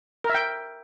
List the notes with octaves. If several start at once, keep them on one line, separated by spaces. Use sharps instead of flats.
A#4
E5
G5